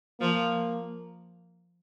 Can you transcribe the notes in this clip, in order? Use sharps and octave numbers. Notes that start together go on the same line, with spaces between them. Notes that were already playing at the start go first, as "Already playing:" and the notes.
F3 A#3